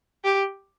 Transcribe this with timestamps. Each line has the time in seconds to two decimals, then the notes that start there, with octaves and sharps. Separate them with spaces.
0.24 G4